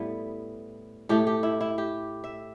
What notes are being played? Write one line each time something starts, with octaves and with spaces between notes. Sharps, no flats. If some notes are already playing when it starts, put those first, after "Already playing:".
Already playing: A2 G3 B3 E4
A2 A3 G4
G4
E4
E4
G4
E5